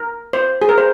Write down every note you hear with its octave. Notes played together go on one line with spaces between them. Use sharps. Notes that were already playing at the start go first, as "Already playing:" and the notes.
Already playing: A#4
C5
G#4
A#4
C5